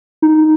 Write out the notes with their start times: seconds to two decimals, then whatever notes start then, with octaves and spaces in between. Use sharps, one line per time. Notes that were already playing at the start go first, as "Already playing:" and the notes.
0.22 D#4